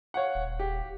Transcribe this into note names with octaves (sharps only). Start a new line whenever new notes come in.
C#5 F5 F#5
D#1
G4